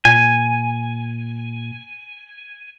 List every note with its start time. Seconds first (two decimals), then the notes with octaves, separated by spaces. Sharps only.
0.05 A#2 G#5